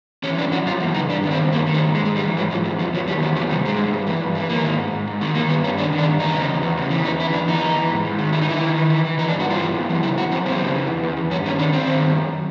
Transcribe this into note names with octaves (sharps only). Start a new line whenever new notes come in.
E3 C#4
F#2 D4
F#2 F#4
F#2 F4
E3
C#3 D#4
G2 D4
D#3
C4
G2
D#3 A#3
D#3
A3
G2
G#2 G#3
G#2 G#3
G3
E3
G#2 F#3
G#2 F3
G#2 E3
E2 F3
E2 F#3
D#3 G3
E2 F#3
D#3 F3
C3 G3
G2 G#3
G2
G2
E3
G2
E3
D#3 A#3
G#2
G#2
G#2
G#2
D#3
D#3 A#3
G2 B3
G2 C#4
D#3 D4
D#3
D4
G2
E2 D#4
C#3
E2
E2
C#3
E3
E2 D#4
E3 E4
E2 D4
E2 D#4
E2
E3
G#2
G#2
D#3
D#3 E4
D#4
D#3 E4
D#3
E3
E3
E3
E3 D#4
D4
G2
F#4
G2 F4
E3
F#2
E3
C#3 E4
F#2 F#4
F#2 C4
E3 C4
C#3
E3
E2
E2
E2
G2 C#4
D#3 C#4
D#3 D4
D#3 C4
D#3
G2
F#2